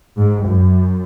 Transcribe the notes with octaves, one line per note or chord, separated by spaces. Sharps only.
G#2
F#2